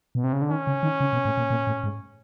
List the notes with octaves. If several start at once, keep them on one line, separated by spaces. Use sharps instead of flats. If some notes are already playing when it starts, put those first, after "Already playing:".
B2
C3
C#3
D3
D#3 C#4
C#3
D#3
C#3
B2
A2
A#2
A#2
A2
G#2